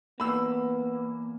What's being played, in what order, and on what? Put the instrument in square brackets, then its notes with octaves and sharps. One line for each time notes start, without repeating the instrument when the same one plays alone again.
[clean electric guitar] E2 A#3 [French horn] B3 [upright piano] B5 E6